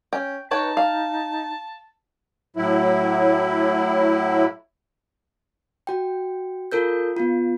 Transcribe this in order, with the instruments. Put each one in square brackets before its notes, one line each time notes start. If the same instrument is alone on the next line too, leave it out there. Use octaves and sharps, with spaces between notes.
[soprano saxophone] C#4 [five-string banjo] G5
[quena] D#4 [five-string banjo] B4 C#5 G5 [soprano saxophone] A5
[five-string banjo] F5
[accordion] A2 F#3 E4
[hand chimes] F#4 G5
F4 A4 A#4 G6
B3 F4